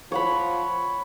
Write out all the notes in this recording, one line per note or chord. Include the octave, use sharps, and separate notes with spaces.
F3 C#5 F#5 B5